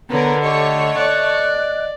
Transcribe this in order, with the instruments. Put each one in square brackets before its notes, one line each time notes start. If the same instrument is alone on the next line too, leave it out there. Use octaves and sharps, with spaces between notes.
[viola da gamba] D3 [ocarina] B3 [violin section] A#4 B4 [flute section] C#5 A#5
[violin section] A3 C#5 C#6 [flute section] G4 [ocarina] D#5
[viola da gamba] D5 [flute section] F#6